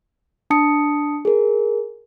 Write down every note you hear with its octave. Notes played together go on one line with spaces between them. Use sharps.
D4 A5 D#6 C#7
G#4 A#4